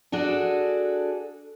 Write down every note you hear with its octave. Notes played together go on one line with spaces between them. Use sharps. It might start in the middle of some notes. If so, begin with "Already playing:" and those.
D4 F#4 G#4 A4